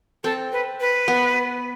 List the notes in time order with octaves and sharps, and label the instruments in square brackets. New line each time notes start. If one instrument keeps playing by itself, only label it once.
[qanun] C4 [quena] A4
[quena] B4
B4
[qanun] B3